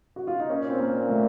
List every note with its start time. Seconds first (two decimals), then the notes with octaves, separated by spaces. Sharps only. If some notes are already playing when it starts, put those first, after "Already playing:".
0.16 F#4
0.27 F4
0.40 D#4
0.50 A#2 C#4
0.69 C4
0.79 A#3
1.09 A3